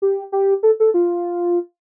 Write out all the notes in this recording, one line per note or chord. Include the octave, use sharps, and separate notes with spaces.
G4
G4
A4
A4
F4